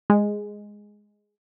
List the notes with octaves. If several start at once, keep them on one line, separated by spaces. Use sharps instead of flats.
G#3